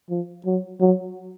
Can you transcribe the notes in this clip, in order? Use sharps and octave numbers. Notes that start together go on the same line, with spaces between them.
F3
F#3
F#3